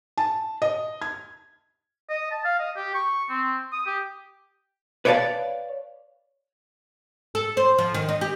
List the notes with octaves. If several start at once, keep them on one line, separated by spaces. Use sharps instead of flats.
A5
D#5
G#6
D#5
A5
F5
D#5
G4
C#6
C4
D#6
G4
B4 C#5 D5 F5 A5
A4
C5
F3
D#3
D#4
G4